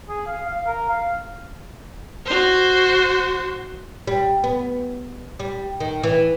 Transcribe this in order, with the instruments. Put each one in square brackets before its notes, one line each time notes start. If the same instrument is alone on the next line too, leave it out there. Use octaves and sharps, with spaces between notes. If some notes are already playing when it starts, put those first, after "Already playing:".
[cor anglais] G#4
F5
F5
A#4
F5
[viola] F#4 C5
[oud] G3
B3
G3
D#3
E3